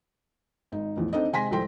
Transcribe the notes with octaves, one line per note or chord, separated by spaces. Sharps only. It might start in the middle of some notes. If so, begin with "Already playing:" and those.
G#1 D#4
A1 E2 F3
C4 D4 D#4 A4 D#5
C3 G#3 G#5 C6 A#6 B6
C2 G#2 F3 A4 G5 C6